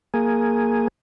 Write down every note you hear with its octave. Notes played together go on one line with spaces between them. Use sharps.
A#3 G#4